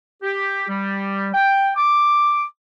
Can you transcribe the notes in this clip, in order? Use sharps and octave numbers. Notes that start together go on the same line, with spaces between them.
G4
G3
G5
D6